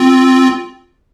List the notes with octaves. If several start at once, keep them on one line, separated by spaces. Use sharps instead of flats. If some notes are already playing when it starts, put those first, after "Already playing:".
Already playing: C4 F4